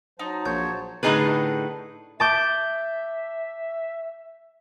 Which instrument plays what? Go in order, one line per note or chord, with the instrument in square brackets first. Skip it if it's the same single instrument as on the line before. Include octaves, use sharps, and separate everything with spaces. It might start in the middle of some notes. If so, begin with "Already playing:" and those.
[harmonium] F#3 C5 A5 [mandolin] D#4
[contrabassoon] A#1 [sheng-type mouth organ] C#5 [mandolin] G6
[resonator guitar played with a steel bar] A2 D3 D#4 G#4 B4
[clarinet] E5 [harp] A5 D6 G6